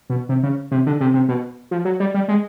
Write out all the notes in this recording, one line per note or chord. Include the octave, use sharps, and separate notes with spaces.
B2
C3
C#3
C3
D3
C3
C3
B2
F3
F#3
G3
G3
G#3